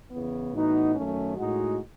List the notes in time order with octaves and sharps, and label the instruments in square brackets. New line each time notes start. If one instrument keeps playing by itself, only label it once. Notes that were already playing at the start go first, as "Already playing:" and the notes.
[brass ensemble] E2 C#3 E3 B3
A2 E3 B3 D#4 F#4
F#2 D#3 A3 C#4
A2 G#3 D#4 F#4